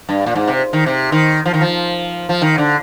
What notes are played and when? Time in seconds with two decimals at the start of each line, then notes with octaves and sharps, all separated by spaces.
0.09 G2
0.26 A#2
0.35 G#2
0.48 C3
0.73 D#3
0.86 C3
1.12 D#3
1.46 F3
1.54 D#3
1.61 F3
2.29 F3
2.42 D#3
2.58 D3